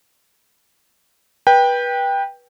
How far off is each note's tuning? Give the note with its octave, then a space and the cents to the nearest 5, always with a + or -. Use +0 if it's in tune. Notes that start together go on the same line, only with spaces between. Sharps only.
B4 -25 G5 +10